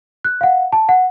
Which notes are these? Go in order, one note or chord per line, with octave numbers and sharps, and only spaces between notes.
F#6
F5 F#5
A5
F#5